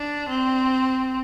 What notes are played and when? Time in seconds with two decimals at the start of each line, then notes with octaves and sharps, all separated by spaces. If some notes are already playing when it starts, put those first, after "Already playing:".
Already playing: D4
0.29 C4